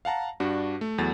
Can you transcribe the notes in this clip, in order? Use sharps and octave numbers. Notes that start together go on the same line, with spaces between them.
F5 F#5 A5 A#5
G2 D4 F#4
A3
E2 F#3 A3 A6